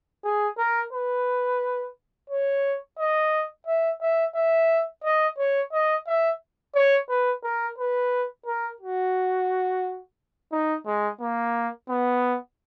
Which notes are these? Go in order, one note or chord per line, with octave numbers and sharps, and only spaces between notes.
G#4
A#4
B4
C#5
D#5
E5
E5
E5
D#5
C#5
D#5
E5
C#5
B4
A#4
B4
A#4
F#4
D#4
G#3
A#3
B3